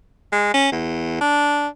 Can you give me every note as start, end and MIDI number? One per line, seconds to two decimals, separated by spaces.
0.32 0.53 56
0.54 0.71 61
0.72 1.18 40
1.21 1.68 62